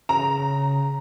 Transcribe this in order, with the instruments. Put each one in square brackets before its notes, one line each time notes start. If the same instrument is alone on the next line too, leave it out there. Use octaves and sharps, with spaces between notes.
[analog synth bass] C#3 [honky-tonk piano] A#5